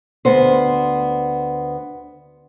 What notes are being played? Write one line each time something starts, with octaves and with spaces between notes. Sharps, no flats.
D2 B3 C5